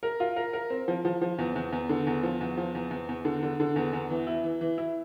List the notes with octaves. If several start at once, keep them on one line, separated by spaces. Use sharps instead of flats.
A#4
F4
A#4
A#4
C4
F3
F3
F3
E2
E2
E2
D3
E2
F3
E2
F3
E2
E2
E2
D3
D3
D3
E2
E2
E3
E4
E3
E3
E4